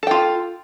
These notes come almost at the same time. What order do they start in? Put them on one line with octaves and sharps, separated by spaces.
A4 G5 F4